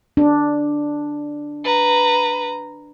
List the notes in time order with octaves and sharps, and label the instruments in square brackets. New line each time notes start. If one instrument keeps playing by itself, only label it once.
[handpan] D4
[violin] B4 A#5